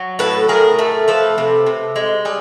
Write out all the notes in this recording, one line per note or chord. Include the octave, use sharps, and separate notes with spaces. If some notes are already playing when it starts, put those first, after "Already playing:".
Already playing: F#3
A2 A4 B4
A2 G#4 A#4
A3
F3 A4 B4
C3
C3
G#3
G3 G#4